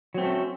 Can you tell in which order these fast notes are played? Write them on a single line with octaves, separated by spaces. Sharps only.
F#3 C4 A3 C#4